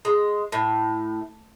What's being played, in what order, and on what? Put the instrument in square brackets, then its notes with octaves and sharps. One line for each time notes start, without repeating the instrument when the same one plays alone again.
[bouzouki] G#3
A2